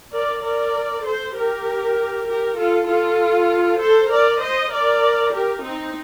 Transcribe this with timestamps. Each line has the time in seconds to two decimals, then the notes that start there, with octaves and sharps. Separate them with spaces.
0.11 A#4 D5
0.43 A#4 D5
1.03 A4 C5
1.34 G4 A#4
2.26 G4 A#4
2.56 F4 A4
2.87 F4 A4
3.80 A4 C5
4.09 A#4 D5
4.40 C5 D#5
4.70 A#4 D5
5.32 G4 A#4
5.62 C4 D#4